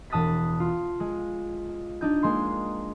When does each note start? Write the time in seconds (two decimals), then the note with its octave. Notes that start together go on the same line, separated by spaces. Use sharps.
0.10 E1 A5 D#6 F#6 A6 B6
0.60 F4
1.00 G#3
2.01 D4 D#4 G6
2.22 G#3 A#3 C6